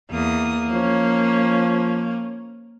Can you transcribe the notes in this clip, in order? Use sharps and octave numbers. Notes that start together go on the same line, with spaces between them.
E2 A#3 D#6
F3 C#4